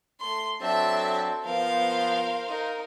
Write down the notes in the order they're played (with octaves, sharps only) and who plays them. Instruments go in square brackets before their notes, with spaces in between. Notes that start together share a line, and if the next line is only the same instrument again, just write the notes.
[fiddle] A3 [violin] C6
[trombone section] F#3 C4 D4 [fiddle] A4 [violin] E5 A5
[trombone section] F3 B3 [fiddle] A#4 [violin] C5 F5
[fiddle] D#4 A#4